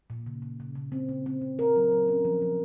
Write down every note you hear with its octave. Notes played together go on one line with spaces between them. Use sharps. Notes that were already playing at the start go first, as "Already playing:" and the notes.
A#2
C#3
C#3
C#3
C#3
C4
C#3
C4
C#3
A#4
F#3
F#3
C#4
F3
F3